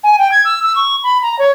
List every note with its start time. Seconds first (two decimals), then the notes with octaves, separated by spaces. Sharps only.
0.04 G#5
0.19 G5
0.32 G#6
0.45 E6
0.63 E6
0.76 C#6
1.04 B5
1.23 A#5
1.39 C#5